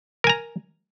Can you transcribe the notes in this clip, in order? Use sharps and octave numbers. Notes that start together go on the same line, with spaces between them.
A#4 G#5 A#5